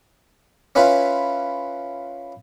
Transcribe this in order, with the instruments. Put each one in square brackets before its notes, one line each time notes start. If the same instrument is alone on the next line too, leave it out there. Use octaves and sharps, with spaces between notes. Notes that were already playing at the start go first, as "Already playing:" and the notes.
[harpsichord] C#4 E4 F4 B4